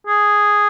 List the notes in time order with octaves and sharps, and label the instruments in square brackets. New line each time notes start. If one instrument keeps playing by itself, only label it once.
[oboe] G#4